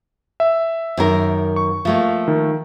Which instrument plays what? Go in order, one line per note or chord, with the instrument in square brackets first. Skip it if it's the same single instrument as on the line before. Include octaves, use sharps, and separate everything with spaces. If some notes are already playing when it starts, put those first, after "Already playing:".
[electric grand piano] E5
[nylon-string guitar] F#2 D#3 A#4
[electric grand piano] C#6
[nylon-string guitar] F3 A3 A#3
[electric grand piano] D#3